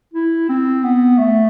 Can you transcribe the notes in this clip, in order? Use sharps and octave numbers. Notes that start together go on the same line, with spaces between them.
E4
C4
B3
A3